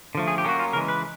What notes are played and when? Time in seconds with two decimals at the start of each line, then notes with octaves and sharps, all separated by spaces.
0.15 D3 F3 A3
0.28 G#4
0.38 G4
0.44 F#3 A#3 C#4 F#4
0.59 F4
0.73 C#3 E3 G#3 A#4
0.88 B4